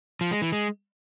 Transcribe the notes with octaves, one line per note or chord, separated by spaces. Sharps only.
F3
G#3
E3
G#3